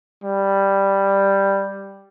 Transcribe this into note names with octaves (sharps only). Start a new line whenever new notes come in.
G3